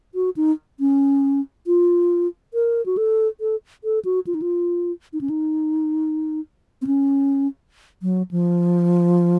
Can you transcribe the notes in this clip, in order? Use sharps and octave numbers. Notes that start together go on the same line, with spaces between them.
F#4
D#4
C#4
F4
A#4
F#4
A4
A4
A4
F#4
F4
D#4
F4
D#4
C#4
D#4
C4
C#4
F#3
F3